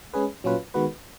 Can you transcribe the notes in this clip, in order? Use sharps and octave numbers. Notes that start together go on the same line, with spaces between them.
G#3 C#4 G#4 B4
A#2 F#3 C#4 F4 B4
D#3 G#3 B3 F#4 B4